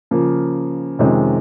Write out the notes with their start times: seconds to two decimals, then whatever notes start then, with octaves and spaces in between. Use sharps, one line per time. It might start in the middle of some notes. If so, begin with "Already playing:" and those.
0.11 C#3 F3 A#3
0.99 F2 C3 D#3 G#3 C#4